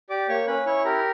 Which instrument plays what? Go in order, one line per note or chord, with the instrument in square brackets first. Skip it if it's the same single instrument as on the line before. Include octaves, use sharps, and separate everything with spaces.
[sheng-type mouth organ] G4 D5 D6
A#3 C#5 C#6
C#4 B4 B5
E4 C#5 C#6
G4 A#4 A#5